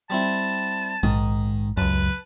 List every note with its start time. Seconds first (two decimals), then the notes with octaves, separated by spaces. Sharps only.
0.10 G3 C4 E4 A5
1.03 A#1 G#2 D#3 D#6
1.77 C#2 F#2 B4 A5